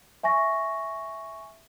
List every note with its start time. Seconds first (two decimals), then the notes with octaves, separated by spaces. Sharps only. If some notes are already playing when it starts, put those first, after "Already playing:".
0.23 E5 G#5 C#6 A#6